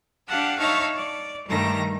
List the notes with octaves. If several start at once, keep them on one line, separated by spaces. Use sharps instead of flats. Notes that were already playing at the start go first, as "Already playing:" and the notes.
D4 G4 F5 F#5 A5
D#4 C#5 E5 F5 A5 C#6
D5
G2 D#3 G3 A3 A#5 A#6